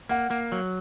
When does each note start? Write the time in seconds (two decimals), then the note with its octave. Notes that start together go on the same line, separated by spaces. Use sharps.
0.09 A#3 F#5
0.31 A#3
0.52 F#3